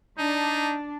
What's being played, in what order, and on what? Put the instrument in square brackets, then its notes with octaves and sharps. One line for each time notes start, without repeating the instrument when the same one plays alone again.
[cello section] D4 [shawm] D#4